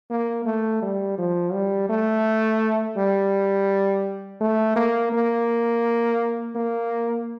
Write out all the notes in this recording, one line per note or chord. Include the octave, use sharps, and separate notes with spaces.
A#3
A3
G3
F3
G3
A3
G3
A3
A#3
A#3
A#3